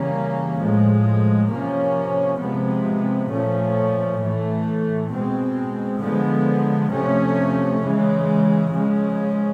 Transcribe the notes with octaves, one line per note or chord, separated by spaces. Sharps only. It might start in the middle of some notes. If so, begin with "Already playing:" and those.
Already playing: C#3 E3 G3 A#3 C#4
A2 F3 G#3
C3 F3 A#3 C#4
C3 F3 G#3 B3
A#2 F3 A3 C#4
A2 E3 A3
B2 G#3 C4
D3 F3 G#3 B3
C3 F3 A3 C#4
C#3 E3 G#3
C#3 F3 G#3 C#4